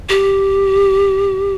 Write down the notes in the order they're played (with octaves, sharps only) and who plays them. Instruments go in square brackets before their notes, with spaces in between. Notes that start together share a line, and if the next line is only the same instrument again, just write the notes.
[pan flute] G4